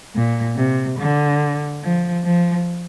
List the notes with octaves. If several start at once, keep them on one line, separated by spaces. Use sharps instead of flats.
A#2
C3
D3
F3
F3